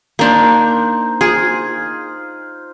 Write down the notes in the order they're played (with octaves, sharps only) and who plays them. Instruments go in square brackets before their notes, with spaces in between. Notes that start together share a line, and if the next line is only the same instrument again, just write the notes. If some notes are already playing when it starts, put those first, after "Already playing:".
[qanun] A#3 D4 [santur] D#4 C5
[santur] F4 [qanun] G#4